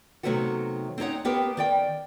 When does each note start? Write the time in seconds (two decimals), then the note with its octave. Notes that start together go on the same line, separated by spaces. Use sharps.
0.23 C3 D#3 F#3 A3 B3 F#4
0.98 C4 C#4 D#4 C#5 F#5
1.25 B3 C4 G4 A#4 B4
1.57 D#3 D5 G5